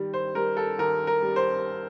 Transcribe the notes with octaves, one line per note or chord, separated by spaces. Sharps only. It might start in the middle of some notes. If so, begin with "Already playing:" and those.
Already playing: D#3 G3
C5
G3 A#4
A4
D#2 A#4
A#4
G3
C5